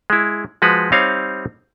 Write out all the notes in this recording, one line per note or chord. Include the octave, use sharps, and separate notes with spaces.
G#3 E4
F3 G#3 F#4 B4
G3 C4 D#4 C#5 F5